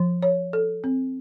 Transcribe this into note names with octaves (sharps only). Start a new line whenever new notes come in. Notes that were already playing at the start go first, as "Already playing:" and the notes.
Already playing: F3
C#5
A4
C4